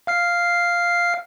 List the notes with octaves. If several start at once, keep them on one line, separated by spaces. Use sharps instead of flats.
F5 F6 C7